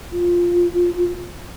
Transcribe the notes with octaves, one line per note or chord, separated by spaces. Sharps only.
F4